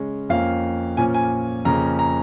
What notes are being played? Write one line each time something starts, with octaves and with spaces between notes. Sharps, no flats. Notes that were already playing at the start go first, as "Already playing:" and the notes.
Already playing: C#3 G#3 C#4
F2 F3 A#3 C#4 F5
A#2 F3 A#3 C#4 G#5
G#5
F2 C#3 A#3 C#4 A#5
A#5